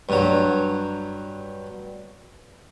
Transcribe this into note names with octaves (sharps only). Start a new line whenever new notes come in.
G2 F#3